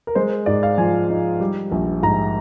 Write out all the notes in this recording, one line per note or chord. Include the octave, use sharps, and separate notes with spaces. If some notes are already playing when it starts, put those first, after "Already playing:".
A#4
G#3 C5
G#2 D5
F5
F3 G#5
D#4
G3
A#1
G#2 A#5